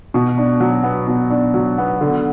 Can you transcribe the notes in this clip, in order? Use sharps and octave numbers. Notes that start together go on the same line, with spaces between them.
B2
D4
F#3
B3
B2
D4
F#3
B3
D3